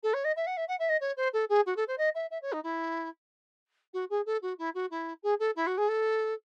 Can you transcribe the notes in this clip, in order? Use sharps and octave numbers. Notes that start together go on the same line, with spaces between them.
A4
C#5
D#5
E5
F#5
E5
F#5
E5
D#5
C#5
C5
A4
G#4
F#4
A4
C5
D#5
E5
E5
C#5
D#4
E4
F#4
G#4
A4
F#4
E4
F#4
E4
G#4
A4
E4
F#4
G#4
A4